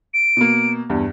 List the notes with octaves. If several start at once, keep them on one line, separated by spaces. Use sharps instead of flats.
D7
B2 A#3
E2 G2